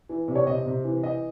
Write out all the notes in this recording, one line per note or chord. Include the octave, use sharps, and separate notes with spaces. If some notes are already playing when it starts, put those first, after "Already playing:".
E3
C3
C#5
C3 D#5
C3
E3
E3 D#5